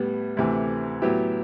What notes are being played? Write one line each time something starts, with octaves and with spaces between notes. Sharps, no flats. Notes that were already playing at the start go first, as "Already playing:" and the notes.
Already playing: A2 G3 B3
D2 C3 E3 A3
A2 F#3 B3 E4 G4